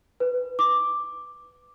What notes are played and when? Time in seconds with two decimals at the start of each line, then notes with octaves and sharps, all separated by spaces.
0.20 B4
0.59 D6